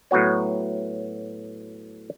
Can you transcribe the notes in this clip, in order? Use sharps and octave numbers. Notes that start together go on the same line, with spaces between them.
A2 F#3 B3 F#4 C#5